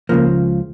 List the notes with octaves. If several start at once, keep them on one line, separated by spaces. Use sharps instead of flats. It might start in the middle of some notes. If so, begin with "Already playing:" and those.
C#2 C#3 F3 A#3